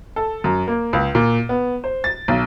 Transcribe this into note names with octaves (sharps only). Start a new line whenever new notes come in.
A4
F#2
A#3
C#2
A#2
B3
C5
A6
B1